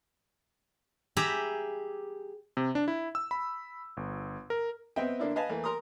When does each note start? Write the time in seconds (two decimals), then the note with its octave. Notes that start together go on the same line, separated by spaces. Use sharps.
1.17 G4 G#4 E5 A#5 B5
2.57 C3
2.75 D4
2.88 E4
3.15 E6
3.31 B5
3.97 G1
4.50 A#4
4.96 B3 C4 D#5 E5 G5
5.20 D3 A#3 D4 E4
5.36 B4 D#5 F5 G#5 A5
5.49 E3 A3 A#3
5.64 A#4 A#5 C6 D#6